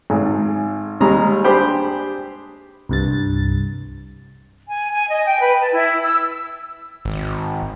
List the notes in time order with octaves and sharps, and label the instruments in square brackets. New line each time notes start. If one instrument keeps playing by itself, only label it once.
[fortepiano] G#1 G#2
D#2 G3 G#3 A#5
D4 G4 G#4 C5 G5 B5
[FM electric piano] C2 G2 A6
[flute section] G#5
G#5
D#5
G5
B4
A5
E4
E6
[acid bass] G#1